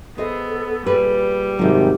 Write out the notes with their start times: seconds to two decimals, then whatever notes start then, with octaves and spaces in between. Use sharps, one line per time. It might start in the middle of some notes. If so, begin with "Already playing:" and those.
0.18 B3 G#4 A4 C5 D#5
0.86 A#2 G3 G#4 B4
1.59 G#1 C3 F#3 G4